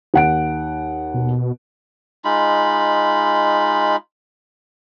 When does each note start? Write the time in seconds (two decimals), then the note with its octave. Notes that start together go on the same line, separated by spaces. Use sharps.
0.14 D#2 F#5 D7
1.14 B2
2.25 G#3 D#4 F4 B5